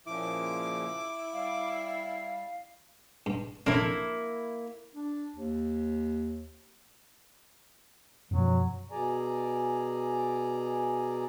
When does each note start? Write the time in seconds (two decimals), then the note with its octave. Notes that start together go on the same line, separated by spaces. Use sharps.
0.06 A#2 C#3 F3 E4 D6
1.33 G3 F5
3.26 G2
3.66 F2 F#3 A#3 D4 E4
4.96 D4
5.36 D#2
8.31 F#2 B2 F3 F#3
8.91 B2 G#4 D5 G#5 A#5